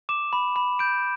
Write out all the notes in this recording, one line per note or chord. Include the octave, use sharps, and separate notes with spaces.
D6 E7
B5
B5
G6 D7